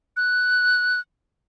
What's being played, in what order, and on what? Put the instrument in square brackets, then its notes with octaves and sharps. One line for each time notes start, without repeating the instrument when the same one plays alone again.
[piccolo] F#6